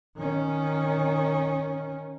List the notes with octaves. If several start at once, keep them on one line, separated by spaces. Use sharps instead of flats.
D#3 C#4